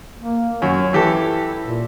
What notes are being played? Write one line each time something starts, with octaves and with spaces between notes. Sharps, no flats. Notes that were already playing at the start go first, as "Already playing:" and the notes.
A#3
F#2 C#5
E3 E4 G4 A4
A#2